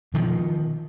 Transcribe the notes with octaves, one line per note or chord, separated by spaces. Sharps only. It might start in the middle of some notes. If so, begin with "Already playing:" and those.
B2 D#3 F3